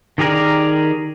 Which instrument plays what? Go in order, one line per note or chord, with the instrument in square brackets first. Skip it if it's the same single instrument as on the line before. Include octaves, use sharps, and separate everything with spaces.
[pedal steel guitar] D#3 G4 G#4 A#4 D5